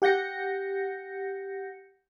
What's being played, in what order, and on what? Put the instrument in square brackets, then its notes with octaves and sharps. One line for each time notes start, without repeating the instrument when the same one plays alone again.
[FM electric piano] G4 F#5 G6 A#6 C#7